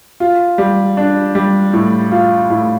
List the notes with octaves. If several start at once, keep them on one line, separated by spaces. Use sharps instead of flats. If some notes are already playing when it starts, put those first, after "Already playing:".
F4
G3
D4
G3
A2
F4
A2